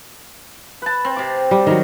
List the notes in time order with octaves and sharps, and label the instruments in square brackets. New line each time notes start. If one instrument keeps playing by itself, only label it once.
[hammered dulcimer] B4 A5
C4
C3 D6
[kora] G3
D#3 F#3